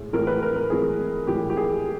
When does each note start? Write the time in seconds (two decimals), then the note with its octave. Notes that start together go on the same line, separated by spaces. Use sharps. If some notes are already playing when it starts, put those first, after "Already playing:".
Already playing: A2 G#3
0.13 A2 E3 G#3 A#4
0.27 B4
0.42 A#4
0.56 A#4
0.70 A2 E3 G#3 G#4
1.27 A2 E3 G#3 G4
1.50 G4
1.57 G#4